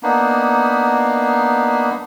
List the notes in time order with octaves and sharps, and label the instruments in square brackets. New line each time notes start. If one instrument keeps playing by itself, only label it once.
[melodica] A#3 B3 D4 D#4